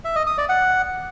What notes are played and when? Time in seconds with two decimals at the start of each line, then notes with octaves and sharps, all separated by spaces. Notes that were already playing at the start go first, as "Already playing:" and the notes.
0.04 E5
0.16 D#5
0.27 D#6
0.38 D5
0.49 F#5